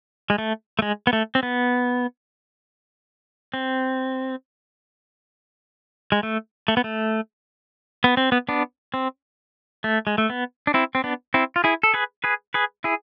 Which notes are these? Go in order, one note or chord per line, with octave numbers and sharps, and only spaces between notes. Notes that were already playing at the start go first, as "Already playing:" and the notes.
G#3
A3
A3
G#3
B3
A3
C4
B3
C4
G#3
A3
A3
B3
A3
B3
C4
B3
B3 D4
C4
A3
G#3
A3
B3
D4
C4 E4
C4
B3 D4
C4 E4
F4
E4 G#4
A4
G#4 B4
G#4 B4
G#4 B4
E4 G#4